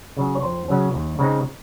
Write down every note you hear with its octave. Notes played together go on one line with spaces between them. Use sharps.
C#3 F#3 C#4
C#5
F2 C5
C#3 F#3 C#4
D#2
C#3 G#3 C4 D#4